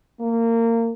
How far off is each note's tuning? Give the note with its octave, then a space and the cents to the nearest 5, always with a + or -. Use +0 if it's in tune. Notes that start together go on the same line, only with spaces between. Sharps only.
A#3 -25